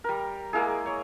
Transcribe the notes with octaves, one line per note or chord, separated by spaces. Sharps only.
G3 A#4
G#3 A#3 E4 G#4
C#5